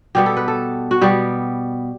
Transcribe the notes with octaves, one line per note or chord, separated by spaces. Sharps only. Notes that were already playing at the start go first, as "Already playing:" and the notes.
B2 G3 B3 G4
A4
B4
A4
F#4
B2 G3 B3 G4